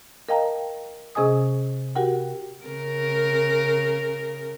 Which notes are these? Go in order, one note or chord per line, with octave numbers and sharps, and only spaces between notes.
A#4 D#5 F5 G5 A5 A#5
C3 C#4 G#4 D#5 G#5 D#6
F#4 G4 A#4 F#5 G5
C#3 A#4